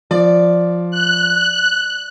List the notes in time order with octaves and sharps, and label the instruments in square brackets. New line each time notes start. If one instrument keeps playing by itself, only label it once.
[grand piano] F3 [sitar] D5
[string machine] F#6